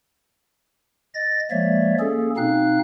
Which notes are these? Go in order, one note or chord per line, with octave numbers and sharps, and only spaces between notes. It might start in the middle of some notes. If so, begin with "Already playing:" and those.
D#5 A6 A#6
F3 G#3 A#3 C#5 D5 E5
A#3 C#4 G#4 A4
B2 C4 D#4 F5 F#6